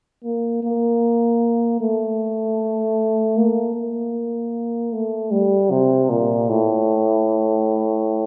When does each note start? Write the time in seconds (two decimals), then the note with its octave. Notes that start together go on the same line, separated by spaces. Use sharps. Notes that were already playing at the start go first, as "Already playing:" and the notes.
0.24 A#3
0.63 A#3
1.81 A3
3.37 A#3
3.75 A#3
4.93 A3
5.31 G3
5.71 C3
6.10 A#2
6.49 A2